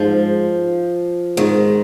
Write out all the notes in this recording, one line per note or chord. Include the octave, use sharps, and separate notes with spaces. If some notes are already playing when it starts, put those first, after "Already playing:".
Already playing: G#2 F3
G#2 D#3